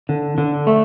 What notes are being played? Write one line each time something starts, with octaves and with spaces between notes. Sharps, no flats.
D3
D3
A3